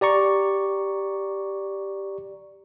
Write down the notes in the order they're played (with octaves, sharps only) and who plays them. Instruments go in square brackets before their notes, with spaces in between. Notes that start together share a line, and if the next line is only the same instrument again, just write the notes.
[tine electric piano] G4 D5 A#5 C#6